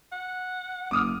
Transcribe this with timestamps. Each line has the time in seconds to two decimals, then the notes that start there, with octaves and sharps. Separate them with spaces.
0.12 F#5
0.91 F#1 D6 D#6 F6